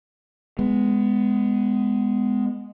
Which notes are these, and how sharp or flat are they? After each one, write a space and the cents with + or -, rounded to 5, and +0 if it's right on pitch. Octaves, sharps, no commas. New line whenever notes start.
G#3 +0 B3 +15